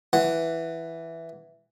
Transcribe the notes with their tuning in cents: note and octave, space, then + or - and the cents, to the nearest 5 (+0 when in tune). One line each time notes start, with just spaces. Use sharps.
E3 +0 F#5 +0